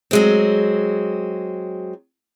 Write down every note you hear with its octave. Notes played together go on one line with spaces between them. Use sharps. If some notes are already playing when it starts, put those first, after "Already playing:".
F#3 G#3 C4